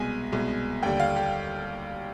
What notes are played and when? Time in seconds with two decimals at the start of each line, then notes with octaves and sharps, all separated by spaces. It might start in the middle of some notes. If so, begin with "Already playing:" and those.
Already playing: C2 B2 G#3 G#5
0.32 C2 B2 G#3
0.83 D#2 D3 G3 G5
1.00 F5
1.16 G4